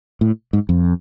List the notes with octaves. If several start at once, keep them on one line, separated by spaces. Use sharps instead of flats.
A2
G#2
F2